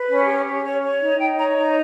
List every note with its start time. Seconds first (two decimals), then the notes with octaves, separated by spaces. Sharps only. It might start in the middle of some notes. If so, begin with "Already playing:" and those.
Already playing: B4
0.08 C#4
0.26 G4
0.45 C#4
0.63 C#5
0.81 C#5
1.00 D#4
1.18 D#4 G5
1.37 C#5 A#5
1.56 D#4 A#5